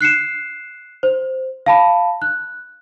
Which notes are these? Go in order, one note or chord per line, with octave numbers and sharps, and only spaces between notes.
F#6 C7 C#7 E7
C5
F5 A5 B5
F#6